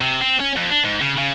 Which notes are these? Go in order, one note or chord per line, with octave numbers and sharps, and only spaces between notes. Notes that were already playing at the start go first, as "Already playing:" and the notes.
C3
C4
C#4
F2
D4
G#2
C#3
C#3